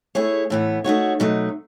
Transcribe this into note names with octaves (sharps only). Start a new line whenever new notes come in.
A3 E4 G#4 C#5
A2 E3 B3
A3 D#4 F#4 C#5
B2 F#3 A3 D#4